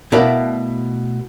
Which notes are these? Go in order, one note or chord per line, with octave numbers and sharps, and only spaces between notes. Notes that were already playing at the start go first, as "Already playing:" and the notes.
B2 A3 E4 A#4 D5 F5